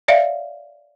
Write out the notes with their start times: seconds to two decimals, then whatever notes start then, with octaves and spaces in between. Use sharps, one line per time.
0.08 C#5 D5 E5 F5